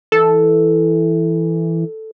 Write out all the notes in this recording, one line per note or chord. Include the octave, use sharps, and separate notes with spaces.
E3 A4